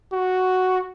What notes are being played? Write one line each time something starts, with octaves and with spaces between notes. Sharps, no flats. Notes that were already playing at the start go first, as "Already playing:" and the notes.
F#4